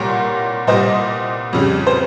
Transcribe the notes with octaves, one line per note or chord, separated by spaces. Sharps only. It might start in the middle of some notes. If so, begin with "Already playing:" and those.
Already playing: C2 A#2 G3 A#4 C#5
C2 A#2 G3 C5 D#5
F2 C#3 G3
C5